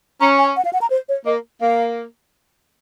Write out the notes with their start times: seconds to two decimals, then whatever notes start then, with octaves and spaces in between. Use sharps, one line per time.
0.21 C#4 A#5
0.39 G#5
0.56 F#5
0.65 F5
0.73 F#5
0.82 A#5
0.90 C5
1.09 C#5
1.26 A#3 D#5
1.61 A#3 F5